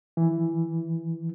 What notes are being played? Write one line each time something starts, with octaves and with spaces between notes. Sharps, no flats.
E3